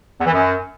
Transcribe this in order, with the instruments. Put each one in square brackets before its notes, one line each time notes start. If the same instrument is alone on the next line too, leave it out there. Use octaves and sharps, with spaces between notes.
[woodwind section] E2
E3
F#2